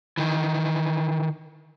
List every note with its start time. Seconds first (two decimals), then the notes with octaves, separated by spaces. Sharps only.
0.17 D#3 E3